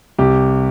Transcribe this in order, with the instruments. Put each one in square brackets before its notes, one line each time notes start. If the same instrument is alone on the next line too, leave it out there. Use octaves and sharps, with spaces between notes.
[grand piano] C2 G4